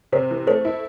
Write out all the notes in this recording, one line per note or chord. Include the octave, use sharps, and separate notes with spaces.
C3 C5
E3
A3 C5
E4